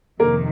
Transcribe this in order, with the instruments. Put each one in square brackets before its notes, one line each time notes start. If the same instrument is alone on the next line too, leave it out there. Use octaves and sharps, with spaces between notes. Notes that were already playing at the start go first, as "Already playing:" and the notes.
[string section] F2 C3 D#3 [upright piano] A#3 A#4